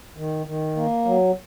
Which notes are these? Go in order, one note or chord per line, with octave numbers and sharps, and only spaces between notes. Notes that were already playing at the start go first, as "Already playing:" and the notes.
D#3
D#3
A#3
F#3